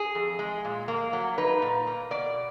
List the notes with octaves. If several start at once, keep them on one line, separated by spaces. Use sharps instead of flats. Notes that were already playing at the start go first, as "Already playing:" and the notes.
Already playing: G#4
F2
G#3
A#2
A#3
F#3
D#4 B4
A#2
A#3
B2 D5